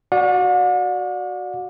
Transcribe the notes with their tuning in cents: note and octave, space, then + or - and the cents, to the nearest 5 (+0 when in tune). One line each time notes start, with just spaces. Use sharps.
F#4 +0 D5 +0 F#5 -45